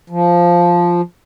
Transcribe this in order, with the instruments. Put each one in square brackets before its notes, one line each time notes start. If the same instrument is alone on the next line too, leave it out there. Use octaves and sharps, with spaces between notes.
[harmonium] F3